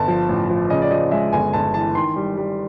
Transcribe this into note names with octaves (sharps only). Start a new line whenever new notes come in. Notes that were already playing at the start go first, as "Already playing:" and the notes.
Already playing: G1 A5
F3
A1
F3
C#3 D#5
D5
F3 D#5
G#3 E5
G1 G#5
G1 A5
E3 A5
D#3 C6
G3
G3